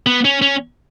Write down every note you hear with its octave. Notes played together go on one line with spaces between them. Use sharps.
B3
C#4
C#4